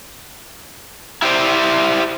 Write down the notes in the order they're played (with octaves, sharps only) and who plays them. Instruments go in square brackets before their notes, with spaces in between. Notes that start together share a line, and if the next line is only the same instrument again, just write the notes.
[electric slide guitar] E4 G4 C5 D5